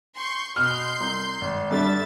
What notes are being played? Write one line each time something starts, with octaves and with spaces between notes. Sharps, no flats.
C6 C#6 G6
B2 C6 F6 G6
C2
G#1
G2 D3 G3 E5 A6